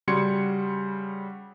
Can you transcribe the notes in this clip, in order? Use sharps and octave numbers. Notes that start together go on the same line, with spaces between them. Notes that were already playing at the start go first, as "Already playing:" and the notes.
C#3 G3 F#4 C6 G#6 C#7